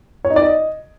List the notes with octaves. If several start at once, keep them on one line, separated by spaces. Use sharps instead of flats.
C#5
D#4
D5
D#5